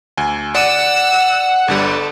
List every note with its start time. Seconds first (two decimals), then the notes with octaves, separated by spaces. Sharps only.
0.17 D2 G#5
0.55 D5 F#5 E6 C#7 D#7
1.68 G1 D3 G3 A4